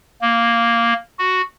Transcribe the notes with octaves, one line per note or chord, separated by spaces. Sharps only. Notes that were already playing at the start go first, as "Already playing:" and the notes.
A#3
F#4